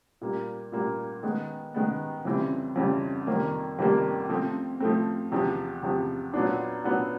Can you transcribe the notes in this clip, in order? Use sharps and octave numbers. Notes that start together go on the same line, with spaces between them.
A#2 G3 A#3
A#2 G3 A#3
D#3 G#3 B3
D#3 G#3 B3
F2 C#3 E3 G3 C4
F2 C#3 E3 G3 C4
F2 C3 D#3 G3 A#3
F2 C3 D#3 G3 A#3
F3 A3 C4
F3 A3 C4
E2 C3 F3
E2 C3 F3
A#2 F#3 B3 D4
A#2 F#3 B3 D4